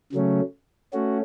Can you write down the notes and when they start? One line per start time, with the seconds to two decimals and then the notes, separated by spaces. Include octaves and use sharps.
0.12 C#3 F#3 A3 C#4
0.93 A3 C#4 F#4